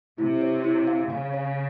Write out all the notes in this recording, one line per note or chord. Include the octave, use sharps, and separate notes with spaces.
C3 E4
C#5
E4
F5
C#3 F5
C#5